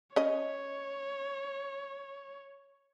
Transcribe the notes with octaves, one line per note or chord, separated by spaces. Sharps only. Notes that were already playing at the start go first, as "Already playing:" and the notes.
C#4 C#5 D#5